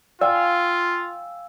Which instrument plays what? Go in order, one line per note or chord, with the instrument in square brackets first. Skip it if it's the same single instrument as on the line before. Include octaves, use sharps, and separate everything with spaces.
[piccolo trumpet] F4 [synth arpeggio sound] D5 [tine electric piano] F5 E6 [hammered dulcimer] G5 G#5